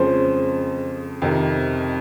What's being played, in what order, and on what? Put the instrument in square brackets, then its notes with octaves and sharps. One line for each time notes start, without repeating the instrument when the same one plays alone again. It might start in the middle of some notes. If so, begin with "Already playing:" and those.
Already playing: [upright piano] F2 C#3 F3 G#3 C#4 [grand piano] C5
[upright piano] F2 C3 D#3